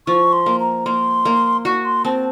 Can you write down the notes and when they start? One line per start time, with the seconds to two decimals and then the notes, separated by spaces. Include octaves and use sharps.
0.07 F3 C#6
0.33 C6
0.46 A#3
0.60 A#5
0.86 A#3 C6
1.25 A#3
1.65 F#4 C#6
1.85 C6
2.05 C4 A5